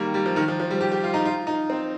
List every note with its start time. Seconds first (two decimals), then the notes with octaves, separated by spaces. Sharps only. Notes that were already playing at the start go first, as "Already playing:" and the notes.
Already playing: D#3 G3 A#3
0.14 G3
0.26 F3
0.36 D#3
0.48 F3
0.60 F3
0.71 G3
0.81 G4
0.92 G4
1.04 F4
1.14 D#4
1.25 F4
1.47 D#4
1.70 C4